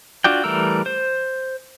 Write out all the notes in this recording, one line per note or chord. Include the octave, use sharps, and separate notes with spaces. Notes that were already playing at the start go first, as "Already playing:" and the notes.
D4 F4 F#4 D5 G5
E3 G3 A3 A#4 E6
C5